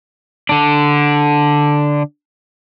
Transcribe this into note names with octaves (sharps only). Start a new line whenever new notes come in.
D3 D4